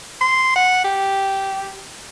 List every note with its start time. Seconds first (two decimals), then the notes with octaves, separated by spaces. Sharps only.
0.21 C6
0.56 F#5
0.84 G4